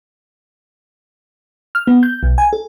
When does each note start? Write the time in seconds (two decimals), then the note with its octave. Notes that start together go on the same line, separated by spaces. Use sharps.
1.75 F6
1.87 B3
2.03 G6
2.23 B1
2.38 G#5
2.53 A4